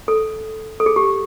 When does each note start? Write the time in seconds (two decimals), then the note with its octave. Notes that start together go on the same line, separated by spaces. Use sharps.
0.08 A4
0.80 A4
0.86 G#4
0.96 G4